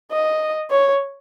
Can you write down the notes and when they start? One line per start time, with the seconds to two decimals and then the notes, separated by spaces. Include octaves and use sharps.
0.12 D#5
0.71 C#5